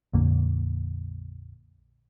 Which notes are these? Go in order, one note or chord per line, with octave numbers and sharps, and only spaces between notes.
A#1 F2 D3 A#3